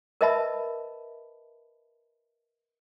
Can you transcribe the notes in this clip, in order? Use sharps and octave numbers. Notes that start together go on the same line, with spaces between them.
A#4 B4 D#5 E5 A5 B5